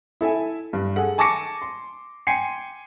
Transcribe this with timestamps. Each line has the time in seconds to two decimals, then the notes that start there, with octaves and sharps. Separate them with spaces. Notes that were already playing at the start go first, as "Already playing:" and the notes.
0.21 E4 A4 E5 G#5
0.73 G2
0.96 G#4 A4 F#5
1.18 G#5 A5 C#6 D6 A#6 C#7
1.62 C6
2.27 G5 G#5 C6 C7 C#7